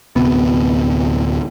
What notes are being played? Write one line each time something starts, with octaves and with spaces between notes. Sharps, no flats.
D1 G1 C3 B3